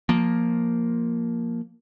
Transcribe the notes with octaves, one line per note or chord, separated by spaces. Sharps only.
F3 A#3